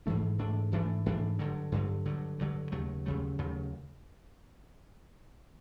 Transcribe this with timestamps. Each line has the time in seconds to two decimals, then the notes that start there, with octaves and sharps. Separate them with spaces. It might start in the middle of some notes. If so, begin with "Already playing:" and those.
0.06 G#2 E3 A3 D4
0.39 G#2 E3 A3 D4
0.72 G#2 E3 A3 D4
1.06 G#2 E3 A3 D4
1.39 G2 D3 F#3
1.72 G2 D3 F#3
2.05 G2 D3 F#3
2.39 G2 D3 F#3
2.72 D#2 C#3 F#3 A3
3.06 D#2 C#3 F#3 A3
3.38 D#2 C#3 F#3 A3